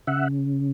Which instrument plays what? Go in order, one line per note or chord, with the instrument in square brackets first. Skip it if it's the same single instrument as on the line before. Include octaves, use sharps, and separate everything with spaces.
[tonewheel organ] C#3 E5 F#5